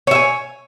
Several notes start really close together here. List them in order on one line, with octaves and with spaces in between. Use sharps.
C#5 E5 G#5